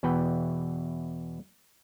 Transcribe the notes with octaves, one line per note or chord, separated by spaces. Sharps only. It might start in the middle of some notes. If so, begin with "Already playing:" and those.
E2 B2 E3 B4 G5